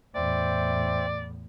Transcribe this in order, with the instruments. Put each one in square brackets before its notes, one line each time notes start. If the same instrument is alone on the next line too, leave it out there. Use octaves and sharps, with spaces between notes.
[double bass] E2 A2 [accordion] C5 E5 G5 [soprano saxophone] D5